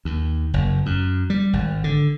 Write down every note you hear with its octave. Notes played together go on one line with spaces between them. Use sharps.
D#2
F#1
F#2
G3
G#1
D3